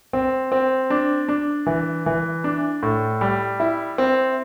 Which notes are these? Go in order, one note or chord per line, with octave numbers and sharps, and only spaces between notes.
C4
C4
D4
D4
E3
E3
D4
A2
G3
E4
C4